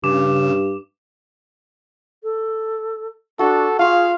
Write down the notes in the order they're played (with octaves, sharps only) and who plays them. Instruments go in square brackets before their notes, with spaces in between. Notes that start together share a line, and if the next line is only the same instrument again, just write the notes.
[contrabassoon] G2 [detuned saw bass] C#3 [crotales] D6 E7
[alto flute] A4
[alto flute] D4 [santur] F#4 [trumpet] A4
[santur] F4 [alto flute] G#4 [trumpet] F5